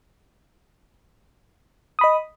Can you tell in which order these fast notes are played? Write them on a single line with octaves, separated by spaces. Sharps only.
D#6 B5 D#5